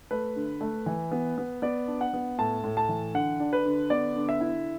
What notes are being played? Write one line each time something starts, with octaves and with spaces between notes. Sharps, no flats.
A3 B4
D3
A3
E3
B3
B3
B3 D5
D4
F#5
B3
A2 A5
A2
A5
E3
D3 F#5
D4
B4
D3
B3 D5
D3
E5
E4